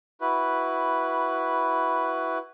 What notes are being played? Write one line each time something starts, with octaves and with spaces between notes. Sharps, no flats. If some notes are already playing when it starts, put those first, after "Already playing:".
E4 F#4 B4